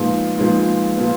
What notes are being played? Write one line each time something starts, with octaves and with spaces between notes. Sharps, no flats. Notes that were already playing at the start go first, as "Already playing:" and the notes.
Already playing: A#2 F3 G#3 B3 D#4
A#2 F3 G#3 B3 D#4
A#2 F3 B3